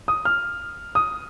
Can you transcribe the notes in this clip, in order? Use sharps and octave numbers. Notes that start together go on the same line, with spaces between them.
D#6
F6
D#6